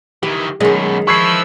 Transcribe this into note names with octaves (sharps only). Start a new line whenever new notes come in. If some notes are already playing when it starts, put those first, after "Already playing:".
D#3 E3 G4
F#2 B2 D#3 G#3 C#4
F3 E4 B4 C#6 E6 G#6 C7